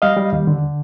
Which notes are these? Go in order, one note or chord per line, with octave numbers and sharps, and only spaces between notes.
G3 D#5 F5
G3
D#2
D3